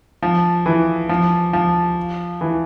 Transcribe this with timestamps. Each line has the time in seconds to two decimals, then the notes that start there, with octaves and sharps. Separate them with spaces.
0.23 F3
0.66 E3
1.09 F3
1.53 F3
2.41 E3